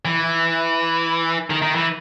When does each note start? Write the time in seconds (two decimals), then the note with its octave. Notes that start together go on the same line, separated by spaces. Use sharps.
0.05 E3
1.50 D#3
1.62 D#3
1.75 E3